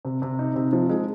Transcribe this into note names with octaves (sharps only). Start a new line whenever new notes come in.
C3
C3
D#4
C3
F3
G#3